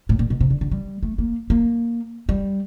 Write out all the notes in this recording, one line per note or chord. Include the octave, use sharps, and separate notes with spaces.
A2
A#2
B2
C3
D3
D3
G3
A3
A#3
A#3
G3